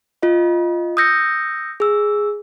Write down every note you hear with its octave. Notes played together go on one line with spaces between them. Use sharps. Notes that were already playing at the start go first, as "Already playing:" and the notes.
F4 D#5
D#6 E6 G6 A#6 C#7
G#4 E6